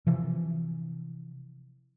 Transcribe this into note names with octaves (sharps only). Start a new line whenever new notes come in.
C3 E3 F3